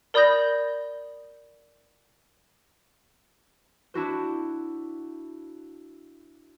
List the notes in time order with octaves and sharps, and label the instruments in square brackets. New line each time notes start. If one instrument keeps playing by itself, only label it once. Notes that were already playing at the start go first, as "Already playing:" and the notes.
[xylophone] A#4 D5 B5 D#6 G6 A#6
[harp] D4 E4 F#4 C5